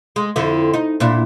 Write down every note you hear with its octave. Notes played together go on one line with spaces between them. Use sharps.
G#3
F2 D3 E4
D#4
A#2 D4 E4